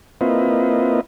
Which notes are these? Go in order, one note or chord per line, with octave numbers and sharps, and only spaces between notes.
A#3 C4 E4 F4 B4 D#5